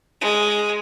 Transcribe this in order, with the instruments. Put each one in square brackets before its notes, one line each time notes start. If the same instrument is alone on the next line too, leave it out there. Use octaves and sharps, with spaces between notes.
[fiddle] G#3